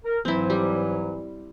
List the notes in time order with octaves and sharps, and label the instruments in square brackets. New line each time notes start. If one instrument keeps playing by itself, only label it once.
[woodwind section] A#4
[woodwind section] G#2 E3 F#3 [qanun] C4 E4
[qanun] G3